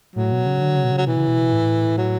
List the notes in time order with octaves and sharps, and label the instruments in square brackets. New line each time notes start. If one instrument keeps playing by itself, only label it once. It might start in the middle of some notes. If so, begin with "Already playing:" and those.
[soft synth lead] A2 [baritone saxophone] F#3
[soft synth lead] B2
C#3
D3
C#3
B2
C#3
[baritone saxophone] F#3
[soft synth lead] B2 [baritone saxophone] E3
[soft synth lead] C#3
B2
A2
[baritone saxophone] F#3